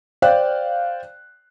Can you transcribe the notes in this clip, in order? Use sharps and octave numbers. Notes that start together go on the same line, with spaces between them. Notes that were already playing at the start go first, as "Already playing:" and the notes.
C5 D5 F5 G5 F#6